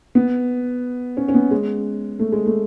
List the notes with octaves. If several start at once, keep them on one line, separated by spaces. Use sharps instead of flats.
B3
C#4
C#4
B3
G#3
A3
G#3
A3